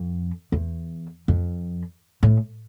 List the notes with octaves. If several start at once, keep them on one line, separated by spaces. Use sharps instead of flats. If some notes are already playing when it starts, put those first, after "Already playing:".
Already playing: F2
E2
F2
A2